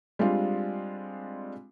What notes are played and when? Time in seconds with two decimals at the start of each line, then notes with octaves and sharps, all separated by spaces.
0.19 G3 G#3 C4 D4 F4